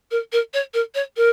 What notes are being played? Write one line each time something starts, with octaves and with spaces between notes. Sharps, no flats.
A#4
A#4
C#5
A#4
C#5
A#4